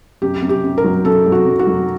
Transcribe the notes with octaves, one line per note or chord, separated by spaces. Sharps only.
F#2 G4
F#2
G4
F#2
A#4
F#3
F#2 A4
F#3
F#4
F#2
F#4
F#3